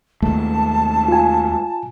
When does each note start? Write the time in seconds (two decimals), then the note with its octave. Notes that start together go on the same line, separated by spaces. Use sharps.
0.22 D#2 G#3 A3 A5
1.08 F4 G#5